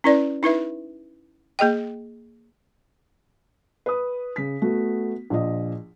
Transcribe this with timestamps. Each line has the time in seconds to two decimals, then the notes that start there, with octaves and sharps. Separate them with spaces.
0.04 C#4 E4 B4 D5
0.43 D#4 E4 B4 E5
1.59 A#3 G#4 D#5 G5
3.86 B4 D#6
4.36 C#3 B6
4.62 A3 B3 F#4
5.30 A#1 F3 D#5